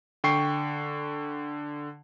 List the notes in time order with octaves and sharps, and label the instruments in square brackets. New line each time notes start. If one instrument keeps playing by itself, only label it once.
[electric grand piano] D3 G5 C#6 C7